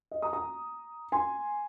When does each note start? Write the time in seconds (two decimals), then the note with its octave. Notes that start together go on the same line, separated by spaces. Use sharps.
0.11 D#5
0.22 A#5 D#6
0.33 A#5 D#6
1.12 G#5 C6